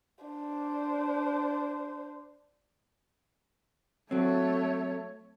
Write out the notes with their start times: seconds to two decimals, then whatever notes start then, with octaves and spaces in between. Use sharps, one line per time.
0.24 D4 C5
4.11 F#3 A3 C4 C#5